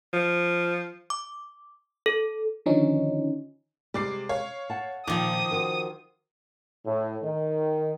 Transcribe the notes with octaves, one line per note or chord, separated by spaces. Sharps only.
F3
D6
A4
D3 D#3 F3 C#4 D#4
C3 G3 G#3 D6 C7
C#5 F5
F#5 A5
A#2 D#3 F3 F4 D6 D#6
C4 F#4 A#4
A2
D#3